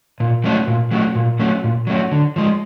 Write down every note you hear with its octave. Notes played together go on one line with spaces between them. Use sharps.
A#2
F#3 A3 C#4 F#4
A#2
F#3 A3 C#4 F#4
A#2
F#3 A3 C#4 F#4
A#2
F#3 A3 C#4 F#4
D3
F3 G#3